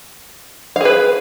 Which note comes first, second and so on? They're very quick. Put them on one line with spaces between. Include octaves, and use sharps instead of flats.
F5 G#4 B4